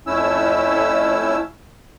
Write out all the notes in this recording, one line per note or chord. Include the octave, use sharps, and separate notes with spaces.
F2 A3 C#4 E4 E6